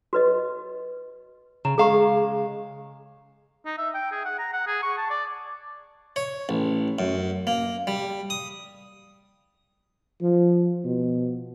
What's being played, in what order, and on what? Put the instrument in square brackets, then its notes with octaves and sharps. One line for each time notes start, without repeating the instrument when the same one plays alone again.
[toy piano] F#4 B4 D#5
[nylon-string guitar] C#3 [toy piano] A#5
[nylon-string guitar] C#3 G#3 F5 [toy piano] G#4 A#5 C#6
[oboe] D#4
E5
G5
G#4
F#5
A#5
F#5
G#4
C#6
A5
D5
[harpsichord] C#5
A1
F#2
A#3
G3
D#6
[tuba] F3
B2